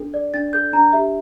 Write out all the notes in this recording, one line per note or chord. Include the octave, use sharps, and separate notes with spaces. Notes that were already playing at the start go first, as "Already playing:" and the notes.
Already playing: D4 A4
D5
D4 A6
A4 G6
D4 A#5
G4 E5